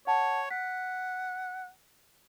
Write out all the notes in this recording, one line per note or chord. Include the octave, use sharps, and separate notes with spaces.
C#5 F#5 A5
F#5 B6